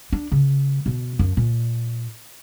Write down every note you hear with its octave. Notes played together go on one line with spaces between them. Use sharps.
D4
C#3
B2
F#2
A#2